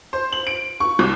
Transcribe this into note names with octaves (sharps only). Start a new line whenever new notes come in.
C5
F#7
D7
C#6
C2